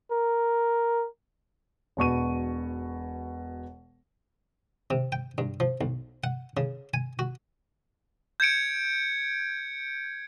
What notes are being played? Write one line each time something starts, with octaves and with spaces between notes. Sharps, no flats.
A#4
E1 B2 C#6 D#7
C3
G5
G2
F3
B1
F#5
C#3
G#5
F#4
G6 G#6 C#7 D7